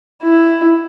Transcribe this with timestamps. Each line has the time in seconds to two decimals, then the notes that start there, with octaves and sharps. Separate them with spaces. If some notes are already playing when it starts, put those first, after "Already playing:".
0.23 E4